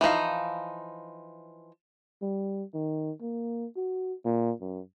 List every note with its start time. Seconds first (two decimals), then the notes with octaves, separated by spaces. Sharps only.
0.01 E3 F3 D#4 F5
2.22 G3
2.74 D#3
3.21 A#3
3.76 F#4
4.25 A#2
4.61 F#2